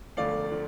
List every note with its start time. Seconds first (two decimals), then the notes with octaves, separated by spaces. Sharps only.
0.17 E1 D2 D3 F3 A3 D5 F5
0.52 D3 F3